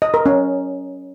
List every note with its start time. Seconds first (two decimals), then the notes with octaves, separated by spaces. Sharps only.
0.02 D#5
0.14 A#4
0.26 C#4